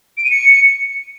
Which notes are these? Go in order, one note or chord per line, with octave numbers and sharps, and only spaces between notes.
D7
D#7
C#7